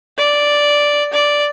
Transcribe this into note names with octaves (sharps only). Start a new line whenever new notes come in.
D5
D5